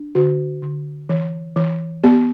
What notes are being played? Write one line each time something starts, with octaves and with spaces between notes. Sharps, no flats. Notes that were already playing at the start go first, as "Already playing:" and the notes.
Already playing: D4
D3 F#4
D3
E3
E3
B3 G4